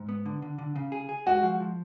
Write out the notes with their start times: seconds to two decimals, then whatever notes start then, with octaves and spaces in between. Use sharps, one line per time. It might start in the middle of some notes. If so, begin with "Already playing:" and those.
Already playing: G#2
0.09 B3
0.26 D3
0.42 D3
0.58 D3
0.76 C#3
0.92 G#4
1.09 G#4
1.26 G#3 F#4
1.43 F3
1.60 F3